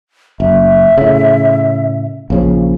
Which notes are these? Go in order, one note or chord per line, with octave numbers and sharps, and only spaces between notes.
F#1 E5
A2 C#3
A#1 C#3 F3 F5